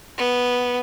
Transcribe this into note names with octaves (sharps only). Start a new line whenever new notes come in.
B3